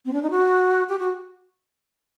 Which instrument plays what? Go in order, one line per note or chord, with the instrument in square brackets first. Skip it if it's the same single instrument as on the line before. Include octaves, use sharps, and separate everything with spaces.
[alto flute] C4
D4
D#4
F#4
G4
F#4